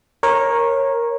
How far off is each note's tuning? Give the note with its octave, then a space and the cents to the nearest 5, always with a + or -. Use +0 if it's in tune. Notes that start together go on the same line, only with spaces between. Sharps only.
A#4 +5 C#5 -20